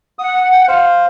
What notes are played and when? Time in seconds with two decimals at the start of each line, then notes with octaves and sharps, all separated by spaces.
0.19 F#5 D#6
0.53 G5
0.68 C5 F5